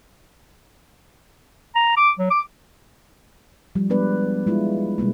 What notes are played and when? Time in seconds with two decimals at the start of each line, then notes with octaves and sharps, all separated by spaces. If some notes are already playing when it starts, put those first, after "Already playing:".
1.75 A#5
1.97 D6
2.19 F#3
2.30 D6
3.75 F3 G3
3.90 G#3 B3 D4 B4 D5
4.47 G#3 E4 F4
4.98 B2 G3 G#3 A#3